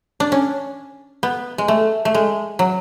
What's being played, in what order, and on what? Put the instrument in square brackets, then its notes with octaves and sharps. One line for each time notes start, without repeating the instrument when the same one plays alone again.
[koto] D4
C#4
B3
G#3
A3
A3
G#3
F#3